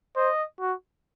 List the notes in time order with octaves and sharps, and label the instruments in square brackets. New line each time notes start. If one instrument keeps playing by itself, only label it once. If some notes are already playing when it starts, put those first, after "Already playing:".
[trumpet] C5 [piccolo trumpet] D#5
[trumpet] F#4